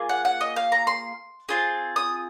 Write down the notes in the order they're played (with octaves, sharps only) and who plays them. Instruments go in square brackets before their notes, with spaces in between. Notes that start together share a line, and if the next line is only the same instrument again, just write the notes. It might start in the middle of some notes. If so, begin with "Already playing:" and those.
Already playing: [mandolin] A#3 F4 G#4
F#5
F#5
D#5
F5
A#5
C6
C4 F4 G#4
D#6